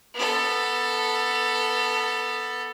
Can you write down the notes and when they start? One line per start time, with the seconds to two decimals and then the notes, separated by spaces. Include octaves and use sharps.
0.15 B3 A4